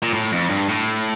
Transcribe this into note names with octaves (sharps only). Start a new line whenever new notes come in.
A#2
A2
F2
G2
A2